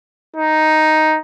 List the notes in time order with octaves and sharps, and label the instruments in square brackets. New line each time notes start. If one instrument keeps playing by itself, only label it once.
[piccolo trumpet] D#4